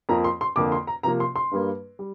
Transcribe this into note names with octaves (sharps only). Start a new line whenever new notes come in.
F2 F3 A#3 A#5
C6
C6
F2 D3 A#3 D6
C6
A#5
C3 F3 A#3 A#5
C6
C6
G2 G3 A#3
G3